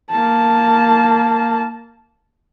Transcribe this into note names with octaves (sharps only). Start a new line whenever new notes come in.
A#3 A5